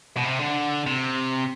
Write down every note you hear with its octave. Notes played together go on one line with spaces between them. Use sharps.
B2
C3
D3
C3